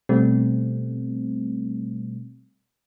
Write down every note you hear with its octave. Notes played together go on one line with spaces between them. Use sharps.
B2 G3 A3 C4